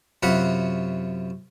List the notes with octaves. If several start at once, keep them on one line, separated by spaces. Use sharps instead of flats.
F#2 C3 F4 F#4 F#5 B5